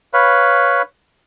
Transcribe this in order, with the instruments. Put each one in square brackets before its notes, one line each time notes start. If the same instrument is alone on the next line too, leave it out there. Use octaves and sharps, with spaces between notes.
[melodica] B4 C#5 F5 B5